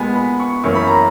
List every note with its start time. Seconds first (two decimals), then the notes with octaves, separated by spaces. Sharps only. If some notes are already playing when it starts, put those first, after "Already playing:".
Already playing: A#2 G#3 B3 G#5
0.16 B5
0.40 C#6
0.64 F#2 E3 A#3 C#4 E4 C#6
0.75 B5
0.88 A#5